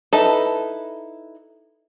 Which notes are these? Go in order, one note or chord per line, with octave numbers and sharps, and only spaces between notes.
D#4 E4 A4 B4